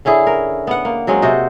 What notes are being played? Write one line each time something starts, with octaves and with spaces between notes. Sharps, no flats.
D3 C#4 E4 G#4
A#4
B3 F#5
A#3
F#3 G#3 C4 C#4
C3 F#4 C5 D#5